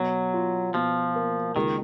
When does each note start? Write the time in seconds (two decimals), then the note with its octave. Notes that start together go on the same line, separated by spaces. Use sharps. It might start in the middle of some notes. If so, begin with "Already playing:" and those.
Already playing: B2 F#3
0.33 F4
0.74 B2 F3
1.15 A#3
1.56 C#2 D#3